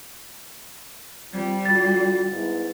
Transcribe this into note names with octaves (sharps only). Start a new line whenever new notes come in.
G3 C4 F4
D3 F4 F#4 A6
G#2 B3 E4